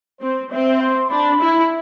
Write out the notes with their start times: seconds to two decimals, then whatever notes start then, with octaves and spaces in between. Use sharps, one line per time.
0.21 C4 C5
0.51 C4 E5
0.81 C6
1.10 D4 B5
1.41 E4